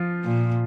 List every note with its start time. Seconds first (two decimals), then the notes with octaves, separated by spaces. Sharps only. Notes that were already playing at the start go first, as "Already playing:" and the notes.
Already playing: F3 F4
0.24 A#2